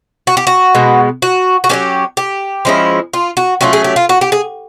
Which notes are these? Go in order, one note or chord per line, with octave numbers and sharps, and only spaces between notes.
F#4
G4
F#4
B2 G#3 B3
F#4
F#4
F#3 A#3 C#4 G4
G4
F3 G#3 C#4 E4
F4
F#4
F#3 A3 C#4 F4 G4
G#4
G4
F4
F#4
G4
G#4